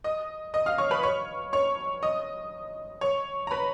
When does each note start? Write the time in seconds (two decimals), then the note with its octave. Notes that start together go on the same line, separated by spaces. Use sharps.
0.04 D#5 D#6
0.54 D#5 D#6
0.66 F5 F6
0.78 C#5 C#6
0.91 B4 B5
1.03 C#5 C#6
1.53 C#5 C#6
2.03 D#5 D#6
3.01 C#5 C#6
3.47 A#5
3.51 B4 B5